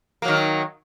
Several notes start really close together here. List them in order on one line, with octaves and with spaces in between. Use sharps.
A#3 F#3 D#3